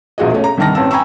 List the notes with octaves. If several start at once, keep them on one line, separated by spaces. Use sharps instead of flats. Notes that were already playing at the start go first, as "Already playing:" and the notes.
E1 A#1 F4 F#4 G#4 D#5
A3 C#4
A#5
C2 G2 D#3 A5 F6 A#6
A1 C4 A5 E6
G5 G#5 A#5 B5 C#6 E6